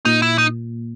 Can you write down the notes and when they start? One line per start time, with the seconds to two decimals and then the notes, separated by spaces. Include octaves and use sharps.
0.05 A#2 D#4
0.22 E4
0.38 D#4